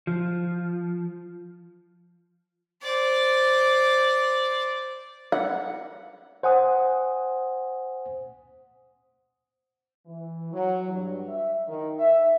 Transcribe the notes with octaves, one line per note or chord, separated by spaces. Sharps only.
F3
C5 D5
F#5
C5 F#5 G#5 D#6
E3
F#3
G2
E5
D#3
E5